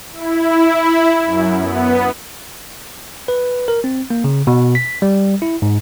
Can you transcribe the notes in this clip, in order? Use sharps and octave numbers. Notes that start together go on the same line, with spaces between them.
E4
F#2
B3
B4
A#4
C4
A#3
C#3
B2
B6
G3
E4
G#2